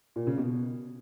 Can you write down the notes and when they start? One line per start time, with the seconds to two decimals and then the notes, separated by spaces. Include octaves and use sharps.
0.16 A#2
0.27 C#3
0.38 B2